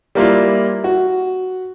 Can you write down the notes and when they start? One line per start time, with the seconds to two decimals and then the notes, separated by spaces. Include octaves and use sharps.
0.15 G3 A#3 E4 F4
0.84 F#4